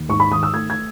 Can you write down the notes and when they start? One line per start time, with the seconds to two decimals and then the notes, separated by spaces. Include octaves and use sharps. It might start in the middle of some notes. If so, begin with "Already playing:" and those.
Already playing: D#2
0.09 G#2 C#6
0.20 B5
0.32 D#3 D#6
0.43 E6
0.54 A3 G#6
0.70 G#6